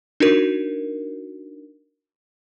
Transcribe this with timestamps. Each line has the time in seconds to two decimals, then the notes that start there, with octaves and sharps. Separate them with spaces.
0.20 D4 D#4 F#4 A#4